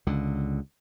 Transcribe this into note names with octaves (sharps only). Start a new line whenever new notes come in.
C#2 D3